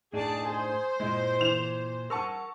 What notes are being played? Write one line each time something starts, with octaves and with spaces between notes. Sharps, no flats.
A2 D4 D#4 G#4 D5 A5
G#4 C5
A#2 G#3 E4
E3 E7 F7
A#4 F#5 A5 C#6 E6